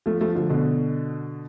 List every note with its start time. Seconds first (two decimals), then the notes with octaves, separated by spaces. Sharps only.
0.06 F3 A3
0.21 F3 A3
0.35 D3 F3
0.50 B2 D3